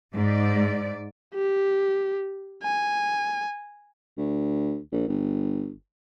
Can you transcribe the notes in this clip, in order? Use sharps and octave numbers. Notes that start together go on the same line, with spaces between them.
G#2 D5
G4
G#5
D2
A#1
G1